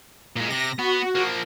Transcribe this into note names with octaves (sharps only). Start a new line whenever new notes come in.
A#2 G#3
C3 A#6
B3 F#4
F3 A#3